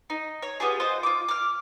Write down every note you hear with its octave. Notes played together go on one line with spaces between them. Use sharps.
D#4
C#5
B3 F4 G4 G#4
F4 C5 D#5 F#5
F4 D6
D6 F6